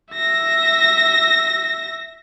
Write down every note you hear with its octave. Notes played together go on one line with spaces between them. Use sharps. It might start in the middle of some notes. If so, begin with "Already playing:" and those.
E5 A#6